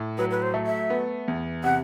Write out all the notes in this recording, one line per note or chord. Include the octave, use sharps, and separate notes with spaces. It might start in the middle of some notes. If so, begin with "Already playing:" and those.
Already playing: A2
F#3 B4
B4
C5
A3
E5
B3
E2
C3 F#5